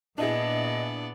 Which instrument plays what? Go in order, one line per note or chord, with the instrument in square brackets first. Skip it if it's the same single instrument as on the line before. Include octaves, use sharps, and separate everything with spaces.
[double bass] A#2 [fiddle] B3 D5 [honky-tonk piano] D4 E4 G#4 [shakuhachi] D#5